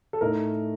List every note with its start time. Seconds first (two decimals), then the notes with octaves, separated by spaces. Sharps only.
0.13 A4
0.21 A2 A3 D#4 A#4